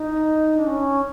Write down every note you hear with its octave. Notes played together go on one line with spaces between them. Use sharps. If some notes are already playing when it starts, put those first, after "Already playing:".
Already playing: D#4
D4
C#4